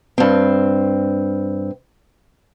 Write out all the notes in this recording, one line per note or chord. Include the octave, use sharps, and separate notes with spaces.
G2 C4